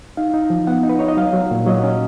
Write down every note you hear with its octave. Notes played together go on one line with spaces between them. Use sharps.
D#4 F5
D#4
F3
B3 F#5
D#4
B4
D#4 C#5
D#5
F#3 F5
F#3
A#2
F#3 D#5
C#4